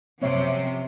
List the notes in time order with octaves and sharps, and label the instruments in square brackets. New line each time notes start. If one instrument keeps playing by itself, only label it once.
[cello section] F#2 C3 F3 [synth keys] C4 C#5 E5